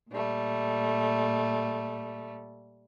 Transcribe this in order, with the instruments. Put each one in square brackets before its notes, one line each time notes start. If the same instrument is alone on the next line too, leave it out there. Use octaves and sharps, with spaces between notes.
[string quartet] A#2 G3 A3